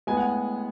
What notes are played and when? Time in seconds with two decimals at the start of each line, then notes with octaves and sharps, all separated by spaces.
0.07 A2 G#3 B3 G#5
0.17 F#5